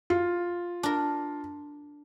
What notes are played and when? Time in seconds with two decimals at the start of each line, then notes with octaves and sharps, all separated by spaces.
0.10 F4
0.83 D4 A#4